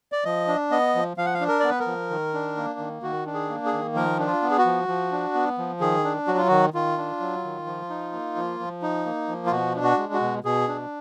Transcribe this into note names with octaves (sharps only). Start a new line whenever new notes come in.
D5
F3 D#5
D4
B3 D#5
F3
F3 F5
F#5
F5
D4
A#4
B3 D5
B4
A#4
F3
D#3
D4
A#3
D#3
D#3 F#4
D4
G#4
A#3
G#4
D#3
F3 A#4
D4
F4
B3
G#4
F#4
F3
F3
D4
B3
F3
D#3 G#4
D4
F#3 F#4
F4
D#3 F#4
D#3 F4
D4
F#3
D#3
F3
D#4
A#3
F3
F3
D#4
A#3
F3
F4
B2 F#4
D4
F#4
G#3
F#4
B2
B2 G#4
D4